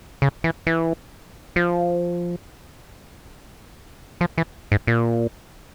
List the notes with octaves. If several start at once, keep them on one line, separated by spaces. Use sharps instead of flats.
C#3
E3
E3
F3
F3
E3
G#2
A#2